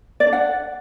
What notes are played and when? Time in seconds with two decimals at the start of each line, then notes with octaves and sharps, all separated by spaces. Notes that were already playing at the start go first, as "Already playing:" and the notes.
0.20 D5
0.26 D4
0.33 F#5